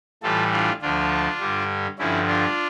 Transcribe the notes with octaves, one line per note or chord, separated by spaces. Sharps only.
A2 E3 G3 F4 A4
D4 F4
D2 D3 F3 D4 F4
G2 D3 G3
G2 D3 F3 C#4 E4
D4 F4